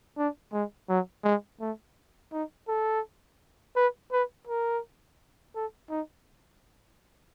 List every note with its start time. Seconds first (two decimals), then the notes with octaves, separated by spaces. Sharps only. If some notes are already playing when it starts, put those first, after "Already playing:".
0.18 D4
0.53 G#3
0.89 F#3
1.24 G#3
1.61 A3
2.32 D#4
2.68 A4
3.76 B4
4.12 B4
4.47 A#4
5.55 A4
5.90 D#4